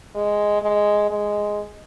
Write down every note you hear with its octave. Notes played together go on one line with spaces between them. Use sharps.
G#3
G#3
G#3